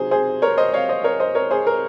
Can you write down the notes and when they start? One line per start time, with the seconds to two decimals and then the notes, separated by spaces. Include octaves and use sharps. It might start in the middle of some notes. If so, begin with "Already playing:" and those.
Already playing: C3 F#3 C4 D#4 G#4 C5
0.11 G#4 C5
0.42 A#4 C#5
0.58 C5 D#5
0.73 C#5 F5
0.89 C5 D#5
1.04 A#4 C#5
1.20 C5 D#5
1.35 A#4 C#5
1.51 G#4 C5
1.67 A#4